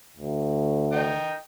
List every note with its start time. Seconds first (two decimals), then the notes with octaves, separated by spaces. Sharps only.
0.17 D2
0.92 D#5 G5